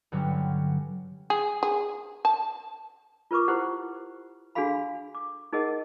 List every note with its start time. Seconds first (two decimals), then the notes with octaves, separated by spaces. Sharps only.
0.12 G2 D3 F#3 G3 C#4
1.30 G#4
1.63 G#4
2.25 A5
3.31 F4 A#4 B4 C#6 D6
3.48 E4 G4 B4 C5 F#5
4.55 D4 F#4 G#4 A4 F5 B5
5.15 D6
5.53 D#4 G#4 A#4 D#5 F#5